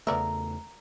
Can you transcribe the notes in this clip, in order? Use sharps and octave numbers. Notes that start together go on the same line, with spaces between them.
E2 C#3 A3 B3 A#4 D5 E5